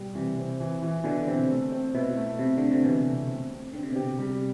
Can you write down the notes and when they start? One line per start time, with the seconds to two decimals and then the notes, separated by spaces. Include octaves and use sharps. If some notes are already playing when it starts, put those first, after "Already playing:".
Already playing: B2 G3
0.15 C3 E3
0.37 C4
0.60 E3
0.82 E3
1.04 B2 D3 E3
1.27 C3 C4
1.50 A3
1.72 C4
1.94 B2 E4
2.17 A3
2.39 C3 E4
2.58 D3 A3
2.71 C3
2.84 B2 E3
3.07 A3
3.29 C4
3.51 C4
3.73 D3 C4
3.83 C3
3.90 B2
3.95 C3 G4
4.19 C3 G3